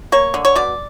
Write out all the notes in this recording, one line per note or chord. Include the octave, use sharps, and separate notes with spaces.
A#3 C#5
D3
C#5
B2 D5